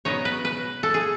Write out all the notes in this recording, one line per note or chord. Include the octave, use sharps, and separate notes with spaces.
B2 F#3 B3 D#4 C#5
B4
B4
A4
G#4